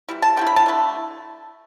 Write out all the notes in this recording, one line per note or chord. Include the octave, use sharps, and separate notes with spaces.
E3 G3 E4
A5
D3 A3 E4 G5
B5
A5
D3 A3 E4